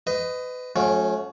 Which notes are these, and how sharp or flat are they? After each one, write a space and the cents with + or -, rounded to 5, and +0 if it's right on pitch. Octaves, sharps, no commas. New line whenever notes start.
B4 +30 D#5 +0
F#3 -45 A3 -25 C#4 +0